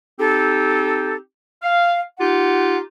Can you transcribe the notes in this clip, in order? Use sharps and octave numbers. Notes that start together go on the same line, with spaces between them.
C4 D#4 G4 A4
F5
D#4 F4 G4 F#5